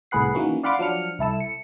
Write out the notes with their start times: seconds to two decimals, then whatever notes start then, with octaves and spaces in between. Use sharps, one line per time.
0.11 C2 A2 G#4 B4 F#5 C7
0.35 D#3 E3 F#3 A#3 C#4
0.63 D5 F5 F#5 B5 C6 D6
0.79 F3 F#3 D4 F6 C#7
1.19 C2 E4 A4 E6
1.40 C#7